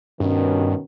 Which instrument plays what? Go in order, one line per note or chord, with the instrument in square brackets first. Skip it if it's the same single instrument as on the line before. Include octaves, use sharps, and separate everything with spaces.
[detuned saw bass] G2 [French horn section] B2 D#3 C#4